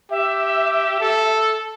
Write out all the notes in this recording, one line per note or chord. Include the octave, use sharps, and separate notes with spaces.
G4 E5
A4